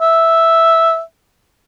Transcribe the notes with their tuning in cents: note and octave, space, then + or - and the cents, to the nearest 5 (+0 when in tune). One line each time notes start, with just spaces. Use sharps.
E5 -5